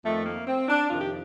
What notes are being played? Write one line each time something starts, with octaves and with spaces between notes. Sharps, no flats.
F2 D#3 A3
A#3
C4
D4
F2 C3 D#3 F4
G4